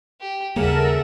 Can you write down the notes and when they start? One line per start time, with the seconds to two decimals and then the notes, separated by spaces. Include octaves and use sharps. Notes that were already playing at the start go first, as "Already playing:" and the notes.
0.21 G4
0.56 D#2 C#3 G3 A#3 A4 A#4 E5 F#5